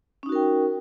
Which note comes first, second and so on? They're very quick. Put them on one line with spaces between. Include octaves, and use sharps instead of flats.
C#4 D#4 F#4 A#4 G5